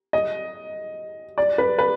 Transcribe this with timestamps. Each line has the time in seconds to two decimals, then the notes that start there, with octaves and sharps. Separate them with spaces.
0.13 D#5
1.38 D5
1.58 B4
1.79 B4